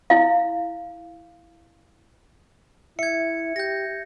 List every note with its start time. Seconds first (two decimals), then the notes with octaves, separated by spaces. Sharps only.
0.10 E4 F5
2.99 E4 E5 G#6 C#7
3.56 G4 G6 A#6